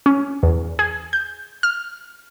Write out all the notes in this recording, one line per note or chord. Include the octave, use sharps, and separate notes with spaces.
C#4
E2
G#4
G6
F6